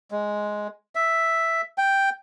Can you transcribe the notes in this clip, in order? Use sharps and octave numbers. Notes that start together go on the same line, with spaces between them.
G#3
E5
G5